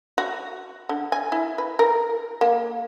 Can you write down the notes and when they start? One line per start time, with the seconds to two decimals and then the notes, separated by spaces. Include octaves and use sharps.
0.18 F#4
0.89 D3
1.12 G#5
1.32 E4
1.58 B4
1.79 A#4
2.41 A#3